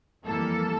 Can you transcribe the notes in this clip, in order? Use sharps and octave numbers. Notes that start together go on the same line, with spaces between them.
F2 E3 G3 A#3 A4